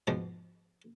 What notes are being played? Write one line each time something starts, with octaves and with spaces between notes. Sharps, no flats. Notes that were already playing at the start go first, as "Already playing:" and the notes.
G#2 B2 E3 F3